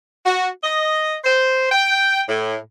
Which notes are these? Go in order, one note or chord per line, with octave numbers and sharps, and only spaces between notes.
F#4
D#5
C5
G5
A2